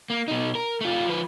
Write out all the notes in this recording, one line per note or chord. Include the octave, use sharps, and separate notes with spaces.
A#3
B2 D#4
A#4
A3 F4
F3 B4